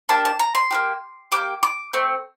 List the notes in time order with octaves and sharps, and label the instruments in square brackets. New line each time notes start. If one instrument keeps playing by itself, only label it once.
[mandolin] A#3 D4 G4 A5
A5
A#5
C6
A#3 D4 G4
A#3 D4 G4 D6
D6
A3 C4